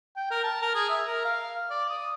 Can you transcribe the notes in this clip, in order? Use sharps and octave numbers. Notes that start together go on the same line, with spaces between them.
G5
A#4
A5
A#4
G#4
E5
A#4
F5
D5
D#6